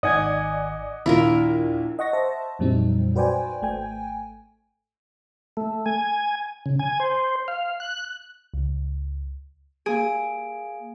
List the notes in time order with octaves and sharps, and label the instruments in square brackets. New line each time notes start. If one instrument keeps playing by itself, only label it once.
[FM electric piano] G#1 D#3 G#5 [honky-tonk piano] D5 D#5 F#5 [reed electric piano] D#6 G#6
[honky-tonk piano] A#1 A#3 [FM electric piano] D#2 [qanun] E4 F4 A#4
[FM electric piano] D#5 F#5 C#6 A#6
C5 E5 A5
F2 A#2 F#3 G3 C4 D#4
F#4 B4 C5 D5 G5 G#5
G#1 A3 G5 G#5
[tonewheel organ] A3
G#5
C#3
G#5
C5
F5
F#6
[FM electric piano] C#2
[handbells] A#3 D7 [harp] G#4